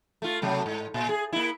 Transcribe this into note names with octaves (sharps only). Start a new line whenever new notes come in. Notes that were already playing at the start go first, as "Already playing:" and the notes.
A3 F4
C3 F#3 A3
G#2
A#2
G#4
A#3 E4